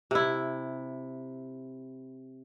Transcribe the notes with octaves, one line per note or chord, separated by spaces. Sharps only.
C3 E4